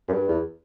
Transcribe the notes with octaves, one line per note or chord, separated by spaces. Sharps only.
F#2
G2
E2